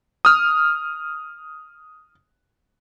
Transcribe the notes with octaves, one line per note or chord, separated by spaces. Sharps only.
D#6 F6